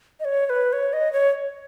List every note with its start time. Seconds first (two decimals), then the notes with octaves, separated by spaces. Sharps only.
0.20 D#5
0.25 C#5
0.46 C#5
0.50 B4
0.73 C#5
0.93 D#5
1.13 C#5